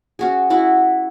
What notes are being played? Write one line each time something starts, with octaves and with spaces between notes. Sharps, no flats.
C#4 F#4 G#4
E4 F#4 F#5